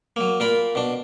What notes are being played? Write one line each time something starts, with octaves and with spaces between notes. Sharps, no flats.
F#3 A#3
A#2 F4 A#4 B5
B2 D4